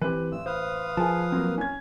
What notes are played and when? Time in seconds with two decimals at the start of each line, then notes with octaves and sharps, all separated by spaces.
0.02 E3 C4 G4 B4
0.32 A1 E6
0.46 B4 C5 F5 D#6
0.97 F3 G#4 A#4 A5
1.32 F#3 A#3 C4 A#4
1.57 C#4 G#6